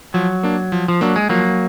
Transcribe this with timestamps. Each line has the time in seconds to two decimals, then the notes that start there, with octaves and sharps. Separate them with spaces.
0.14 F3 F#3
0.43 A#3 D4
0.72 F3
0.88 F3
1.01 F#3 A#3 D4
1.16 G#3
1.29 F3 F#3 A#3